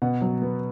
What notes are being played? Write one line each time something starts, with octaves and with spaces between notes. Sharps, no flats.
B2 F#5
F#3
B3